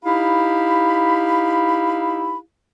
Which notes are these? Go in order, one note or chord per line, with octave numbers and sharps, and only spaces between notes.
D#4 E4 G4 F5 B5